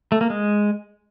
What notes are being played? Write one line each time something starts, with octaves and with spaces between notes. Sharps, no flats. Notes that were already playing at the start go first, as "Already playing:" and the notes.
A3
A#3
G#3